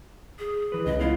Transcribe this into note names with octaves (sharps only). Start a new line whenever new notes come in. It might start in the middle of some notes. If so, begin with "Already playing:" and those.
G#4
E3 B4
C#2 D#5
B3 E4 F4